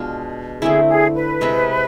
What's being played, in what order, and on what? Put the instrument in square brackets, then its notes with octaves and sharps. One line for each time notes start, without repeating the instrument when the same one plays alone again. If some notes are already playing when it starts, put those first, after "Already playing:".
Already playing: [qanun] B2 G#3 D4 F4
[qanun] D3 A3 C4 E4 [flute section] G#4
[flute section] G#4
B4
[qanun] C3 G#3 C4